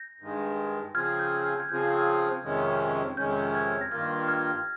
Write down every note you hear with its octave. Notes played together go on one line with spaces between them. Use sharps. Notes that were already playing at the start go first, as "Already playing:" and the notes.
Already playing: G6 A#6
G2 D#3 G#3
C#3 F3 C4 F4 G#4 F6 G#6
G6
F6
G#6
C#3 F3 C4 F4 G#4 G6
F2 C3 D#3 G#3 C#4
F2 C3 D#3 G#3 C#4 G6
F6 G#6
A#6
G2 D#3 A#3 F4 F6 G#6
F6 G#6